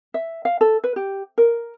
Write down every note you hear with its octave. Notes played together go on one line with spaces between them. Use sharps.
E5
F5
A4
B4
G4
A#4